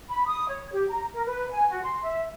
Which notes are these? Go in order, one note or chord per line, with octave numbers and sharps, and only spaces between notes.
B5
D#6
C#5
G4
A#5
A#4
B4
G#5
F#4
C6
E5